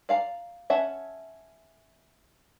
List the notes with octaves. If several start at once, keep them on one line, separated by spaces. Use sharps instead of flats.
D5 F5 A#5
C#4 E5 F#5 A5